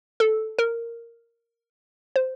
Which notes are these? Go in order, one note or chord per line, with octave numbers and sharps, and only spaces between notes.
A4
A#4
C5